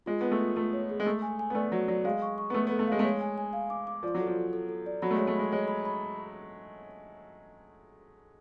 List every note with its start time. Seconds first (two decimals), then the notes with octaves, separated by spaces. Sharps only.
0.06 G#3 F4
0.21 B3 F4
0.32 A3
0.40 F4
0.56 A3 F4
0.73 C#5
0.89 G#4
1.00 G#3
1.05 A3 A4
1.22 G#5
1.39 G#5
1.50 B3
1.55 A3 D5
1.72 F#3 D5
1.88 F#3 D5
2.05 G#3 F5
2.22 C#6
2.38 C#6
2.50 B3
2.54 A3 A4
2.67 B3 A4
2.79 A3
2.88 G#3 F5
2.99 A3
3.03 G#3 C#5
3.21 G#5
3.38 G#5
3.53 F5
3.70 D6
3.87 D6
4.03 F3 D5
4.14 F#3
4.20 A4
4.27 F3
4.36 A4
4.53 A4
4.69 A4
4.86 D5
5.02 F#3 B5
5.11 A3
5.14 G#3 C#5
5.27 A3
5.36 G#3 B5
5.52 G#3 C#5
5.68 B5
5.85 B5